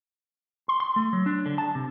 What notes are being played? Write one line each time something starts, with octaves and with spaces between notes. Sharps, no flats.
C6
C6
A3
F#3
D4
D3
A5
C3